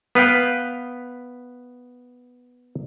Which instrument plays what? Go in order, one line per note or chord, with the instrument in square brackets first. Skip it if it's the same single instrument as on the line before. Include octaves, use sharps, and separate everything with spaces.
[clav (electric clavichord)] B3 B4 F5 G5